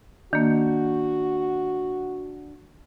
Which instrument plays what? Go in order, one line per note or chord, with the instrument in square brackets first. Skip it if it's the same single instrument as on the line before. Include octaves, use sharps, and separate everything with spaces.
[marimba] D#3 A#3 [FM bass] D4 [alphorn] F#4